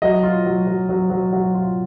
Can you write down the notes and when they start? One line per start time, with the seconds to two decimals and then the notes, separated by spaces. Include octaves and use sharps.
0.02 F#3 D#5
0.23 F4
0.46 F#3
0.67 F#3
0.89 F#3
1.10 F#3
1.33 F#3
1.55 F4